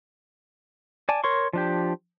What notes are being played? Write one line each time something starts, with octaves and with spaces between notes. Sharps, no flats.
D5 G#5 A5
A#4 C#5 C6 C#6
F3 D4 G4